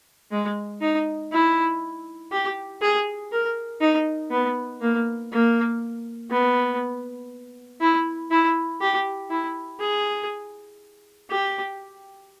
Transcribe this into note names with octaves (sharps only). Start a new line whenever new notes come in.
G#3
D#4
E4
G4
G#4
A#4
D#4
B3
A#3
A#3
B3
E4
E4
G4
E4
G#4
G4